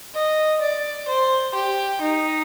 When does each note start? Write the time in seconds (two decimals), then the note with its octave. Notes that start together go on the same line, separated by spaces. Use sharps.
0.15 D#5
0.61 D5
1.08 C5
1.55 G4
2.01 D#4